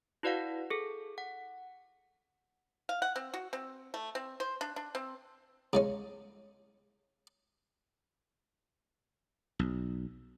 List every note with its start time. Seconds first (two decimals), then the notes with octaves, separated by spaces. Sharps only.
0.23 E4 F#4 B4 D5 F5 F#5
0.70 G#4 A4
1.18 F#5
2.89 F5
3.02 F#5
3.16 C4
3.34 F#4
3.53 C4
3.94 A3
4.15 C4
4.40 C5
4.61 D4
4.76 D4
4.95 C4
5.73 C#3 G#3 C#4
9.59 B1